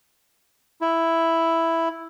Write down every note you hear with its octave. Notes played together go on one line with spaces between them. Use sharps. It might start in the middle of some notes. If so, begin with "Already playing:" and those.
E4